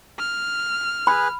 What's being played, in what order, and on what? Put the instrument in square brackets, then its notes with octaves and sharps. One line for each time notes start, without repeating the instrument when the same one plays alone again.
[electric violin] F6
[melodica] G#4 B4 [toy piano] B5